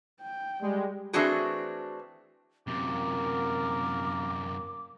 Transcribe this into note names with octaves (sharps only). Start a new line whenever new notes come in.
G5
G3 G#3
E3 A3 C4 D4 F#4 G#4
F#2 C3 A#3 A#4 D6